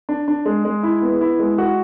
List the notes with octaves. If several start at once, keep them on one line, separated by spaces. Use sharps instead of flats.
D4
D4
G#3
G#3
E4
B3
E4
G#3
F#4